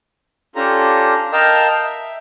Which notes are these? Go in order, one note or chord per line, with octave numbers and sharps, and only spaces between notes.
C#4 D4 F4 G4 A4 A#5
A#4 D#5 F5 G5 A5 E6
E5